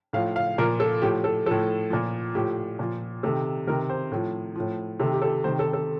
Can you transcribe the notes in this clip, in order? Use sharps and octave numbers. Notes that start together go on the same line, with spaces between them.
A2 F3 F5
F5
A#2 F3 A#4
A4
A2 F3 G4
A4
A2 F3 A4
A#2 F3
A2 F3 G4
A#2 F3
C3 D#3 A4
C3 D#3 A#4
C5
A2 F3
A2 F3
C3 D#3 A4
G4
A4
C3 D#3 C5
A4
A4